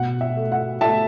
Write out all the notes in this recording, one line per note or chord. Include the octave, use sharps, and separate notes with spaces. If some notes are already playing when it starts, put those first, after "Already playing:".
Already playing: B2 F#5
E5
A3
F#5
A3 E5 A5